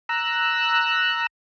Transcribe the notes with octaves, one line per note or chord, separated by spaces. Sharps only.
A#5 E6 F#6